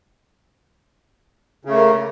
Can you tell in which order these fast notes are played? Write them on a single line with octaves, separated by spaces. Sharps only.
C#3 A3 A#3